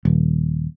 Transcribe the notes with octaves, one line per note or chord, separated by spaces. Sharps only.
D#1